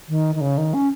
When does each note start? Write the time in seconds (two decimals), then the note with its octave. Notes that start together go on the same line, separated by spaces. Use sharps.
0.09 D#3
0.35 D#3
0.41 C#3
0.58 D#3
0.74 C#4